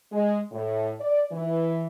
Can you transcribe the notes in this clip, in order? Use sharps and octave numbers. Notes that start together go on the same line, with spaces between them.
G#3
A2
D5
E3